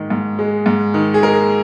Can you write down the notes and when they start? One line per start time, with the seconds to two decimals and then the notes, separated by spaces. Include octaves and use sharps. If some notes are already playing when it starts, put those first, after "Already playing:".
Already playing: G#2 D#3
0.10 G#2
0.39 G#3
0.66 G#2
0.94 D#3
1.14 G#4
1.23 G#3 A#4